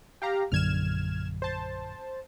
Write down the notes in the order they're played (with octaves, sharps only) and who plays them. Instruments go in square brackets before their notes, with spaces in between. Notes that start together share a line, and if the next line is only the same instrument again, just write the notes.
[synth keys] G4 F5 A#5
[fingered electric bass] A#1 F#2 D3 [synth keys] F6 G#6 E7
[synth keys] C5 A5